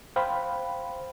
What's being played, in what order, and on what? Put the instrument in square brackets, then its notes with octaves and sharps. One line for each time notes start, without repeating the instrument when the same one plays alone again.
[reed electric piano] C5 F5 G5 B5